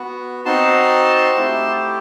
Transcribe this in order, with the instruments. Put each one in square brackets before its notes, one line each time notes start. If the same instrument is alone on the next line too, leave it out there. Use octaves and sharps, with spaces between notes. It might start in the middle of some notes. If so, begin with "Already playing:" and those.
Already playing: [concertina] B3 F#4
C4 D#4 F#4 A5 C6
A3 E4 G4